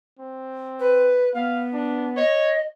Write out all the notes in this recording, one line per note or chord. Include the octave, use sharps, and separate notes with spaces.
C4
B4
B3 F5
D4
C#5 D#5